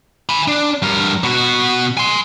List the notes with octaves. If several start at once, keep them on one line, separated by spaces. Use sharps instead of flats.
G#5 B5
D4
G2 A#4
B2 F#4
G#5 C6